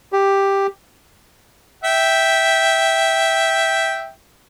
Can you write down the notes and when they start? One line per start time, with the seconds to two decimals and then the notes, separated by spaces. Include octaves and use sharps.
0.13 G4
1.84 E5 G5